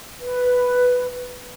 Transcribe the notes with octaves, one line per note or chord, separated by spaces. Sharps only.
B4